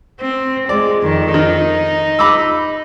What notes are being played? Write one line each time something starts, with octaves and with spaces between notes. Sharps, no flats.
C4
G#3 D5
F2 D#3
D#3 D#4
B5 D6 E6